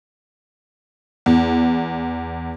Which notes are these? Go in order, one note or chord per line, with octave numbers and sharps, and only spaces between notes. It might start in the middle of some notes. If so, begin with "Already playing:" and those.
E2